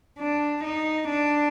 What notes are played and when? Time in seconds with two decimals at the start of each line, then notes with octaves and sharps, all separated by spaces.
0.18 D4
0.63 D#4
1.09 D4